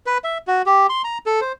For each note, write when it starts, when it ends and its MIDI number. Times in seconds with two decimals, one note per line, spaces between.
0.06 0.18 71
0.24 0.38 76
0.47 0.62 66
0.66 0.87 67
0.89 1.02 84
1.04 1.18 82
1.26 1.40 69
1.41 1.52 72